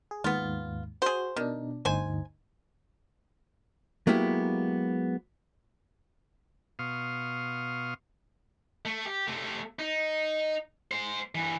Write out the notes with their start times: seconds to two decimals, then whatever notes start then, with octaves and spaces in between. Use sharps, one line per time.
0.11 G#4
0.24 D#2 G#2 B3 F4
1.02 F#4 G#4 C5
1.36 B2 D#3 D4
1.85 G1 D2 D#4 C5 G#5
4.07 F#3 G#3 A#3 B3 E4 G4
6.79 B2 F5 C6 C#6 D#6 F6
8.85 A3
9.05 G4
9.28 C3 A3
9.79 D#4
10.91 G#3 C5
11.35 G2 E3